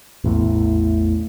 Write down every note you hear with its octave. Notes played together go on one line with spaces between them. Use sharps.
A1 E2 A2